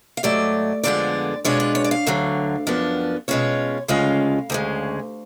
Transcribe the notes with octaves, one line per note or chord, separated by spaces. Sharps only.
F5
G#2 F#3 A3 D5
F2 D3 F3 G#3 B3 D5
B2 G#3 D4 F4 C#5
B4
C#5
D5
F5
D2 D3 F#3
F#2 F3 B3 D4
B2 G#3 C#4 F4 C#5
D2 C#3 G#3 C#4 F4 F5
D2 C#3 G#3